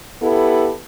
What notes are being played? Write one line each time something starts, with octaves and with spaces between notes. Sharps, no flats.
B3 E4 G4 A4